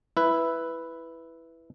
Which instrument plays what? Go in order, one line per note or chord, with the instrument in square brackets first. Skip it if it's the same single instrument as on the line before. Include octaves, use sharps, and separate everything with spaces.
[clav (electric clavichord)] E4 B4